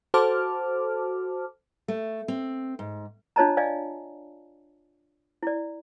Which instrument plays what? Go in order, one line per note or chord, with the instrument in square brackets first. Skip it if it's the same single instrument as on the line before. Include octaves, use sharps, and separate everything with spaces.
[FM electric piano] F#4 A4 C5 A5 D6 F6
[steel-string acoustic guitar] A3
C4
G#2
[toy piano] D4 F4 C#5 D#5 A5 A#5
D5 D#5 F5 G#5
E4 D5